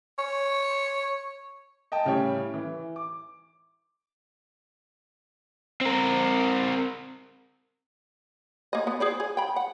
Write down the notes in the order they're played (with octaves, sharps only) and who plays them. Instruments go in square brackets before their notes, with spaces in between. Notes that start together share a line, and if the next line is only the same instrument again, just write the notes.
[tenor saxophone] C#5
[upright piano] D#5 G5 A5
A2 C#3 G3 C#5 G5
E3
D6
[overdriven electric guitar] C4 A#4
[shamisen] A#3 D#5
B3
G#4 C5 D5
G#4
G5 B5
F#5